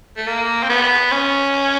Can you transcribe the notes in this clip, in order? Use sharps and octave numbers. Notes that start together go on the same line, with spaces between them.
A3
A#3
C4
B3
C#4